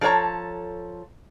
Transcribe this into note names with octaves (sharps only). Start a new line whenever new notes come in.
F3 A4 A#4 C#5 A#5